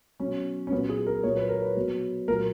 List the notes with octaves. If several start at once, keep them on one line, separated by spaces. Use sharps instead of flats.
B2 F#3 C#4
C#4
A#2 F#3 B3
G#4
A#4
A#2 F#3 C#5
B4
A#4
B4
B2 F#3
A#2 F#3 A#4